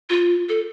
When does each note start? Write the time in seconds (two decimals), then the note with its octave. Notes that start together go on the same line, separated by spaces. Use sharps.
0.10 F4
0.49 A4